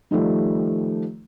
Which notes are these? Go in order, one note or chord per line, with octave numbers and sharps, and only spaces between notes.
D#3 F3 G3 A3